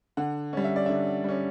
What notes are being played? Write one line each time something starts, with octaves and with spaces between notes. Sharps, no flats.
D3 F#5
G3 C#4
E5
D5
D3 E5
G3 C#4